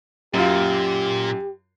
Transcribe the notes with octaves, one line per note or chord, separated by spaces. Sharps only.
F#2 A#2 F4 G4